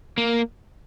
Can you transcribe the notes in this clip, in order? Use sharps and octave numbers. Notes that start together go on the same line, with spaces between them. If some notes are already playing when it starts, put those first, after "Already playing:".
A#3